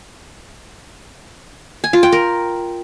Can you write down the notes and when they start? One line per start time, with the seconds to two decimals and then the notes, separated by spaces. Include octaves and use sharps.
1.84 G#5
1.93 F4
2.03 G5
2.12 A#4